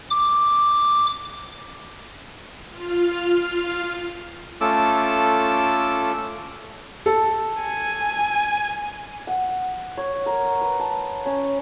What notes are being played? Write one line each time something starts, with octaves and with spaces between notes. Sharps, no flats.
D6
F4 F5
A3 C#4 F4 A4 D6 E6
A4
G#5
F#5
C#5
A#4
B4
A5
C#4